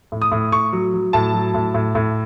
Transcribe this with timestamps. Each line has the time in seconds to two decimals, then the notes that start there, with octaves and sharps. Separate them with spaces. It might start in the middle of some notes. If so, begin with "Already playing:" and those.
0.12 A2
0.22 D#6
0.32 A2
0.52 A2 C#6
0.73 F#3
0.94 F#3
1.13 A2 A5
1.34 F#3
1.54 A2
1.74 A2
1.95 A2